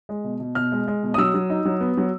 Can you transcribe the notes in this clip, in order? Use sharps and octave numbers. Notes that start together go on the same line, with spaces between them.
G#3
B2
B2
B2 F6
G#3
G#3
B2
D#6
F#3 E6
F#3
D#4
F#3
B3
F#3